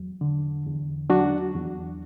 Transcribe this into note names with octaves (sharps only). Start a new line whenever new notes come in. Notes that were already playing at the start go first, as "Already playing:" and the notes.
Already playing: E2 F#3
D3
E2
F#3 D4 F#4
E2